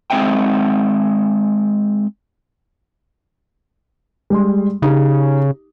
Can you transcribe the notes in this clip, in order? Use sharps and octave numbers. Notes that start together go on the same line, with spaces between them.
G#3 C4 D#5 E5 G5
G3 G#3 C6
C#3 D#4 G4